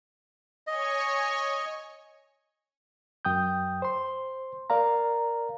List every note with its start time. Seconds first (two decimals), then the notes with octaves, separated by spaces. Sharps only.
0.67 C#5 D#5 G#5 C#6
3.25 F#2 G5 D#6 G6
3.82 C5 C6
4.70 A#4 D5 F5 A#5